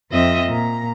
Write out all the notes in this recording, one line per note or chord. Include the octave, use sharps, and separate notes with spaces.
F2 C4 F4 D#5 E5
A#2 A#5